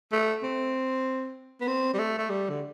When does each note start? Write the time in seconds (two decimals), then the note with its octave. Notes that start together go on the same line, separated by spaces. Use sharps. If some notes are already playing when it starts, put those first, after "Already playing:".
0.12 A3
0.43 C4
1.61 B3
1.68 C4
1.94 G3
1.99 A3
2.18 A3
2.30 G3
2.49 D3